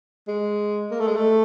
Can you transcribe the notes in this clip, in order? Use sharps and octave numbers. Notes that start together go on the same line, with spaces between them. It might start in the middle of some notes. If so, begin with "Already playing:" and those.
G#3
A#3
A3
G#3
A3